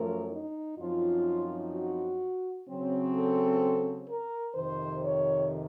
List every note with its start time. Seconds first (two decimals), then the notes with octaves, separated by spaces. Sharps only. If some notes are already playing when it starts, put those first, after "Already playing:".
Already playing: F#2 F3 A3 A#4
0.32 D#4
0.78 F#2 F3 C4 D#4 F4
1.72 F#4
2.67 C#3 F#3 C4
3.13 A4
4.07 A#4
4.54 F2 C3 D#3 C5
5.03 C#5